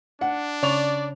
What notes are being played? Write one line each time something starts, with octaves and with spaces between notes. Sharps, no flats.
D4 F#5
C#3 D5 C#6 F7